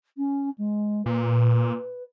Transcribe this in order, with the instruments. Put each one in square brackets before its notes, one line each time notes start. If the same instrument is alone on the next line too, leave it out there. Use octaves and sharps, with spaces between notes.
[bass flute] C#4
G#3
[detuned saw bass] A#2 [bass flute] B4